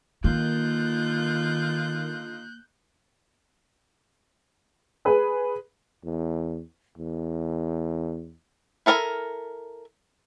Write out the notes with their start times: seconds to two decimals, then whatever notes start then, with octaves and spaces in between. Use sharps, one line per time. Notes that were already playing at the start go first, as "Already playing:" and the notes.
0.24 D3 D#3 A#3 D#4 F4 F#6 G6
5.05 G#4 B4
6.05 E2
6.98 E2
8.86 E4 A4 A#4 D5 G#5